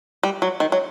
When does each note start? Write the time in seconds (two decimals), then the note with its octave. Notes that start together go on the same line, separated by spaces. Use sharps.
0.23 G3
0.42 F#3
0.60 D#3
0.72 F#3